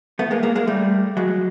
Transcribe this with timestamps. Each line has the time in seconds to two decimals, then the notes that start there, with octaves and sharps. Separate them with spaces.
0.19 A3 B3
0.31 G#3 A#3
0.43 G#3 A#3
0.56 G#3 A#3
0.67 G3 A3
1.17 F#3 G#3